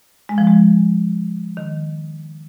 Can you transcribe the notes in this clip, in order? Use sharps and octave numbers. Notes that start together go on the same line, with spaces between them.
G#3
F3
G#3
D#3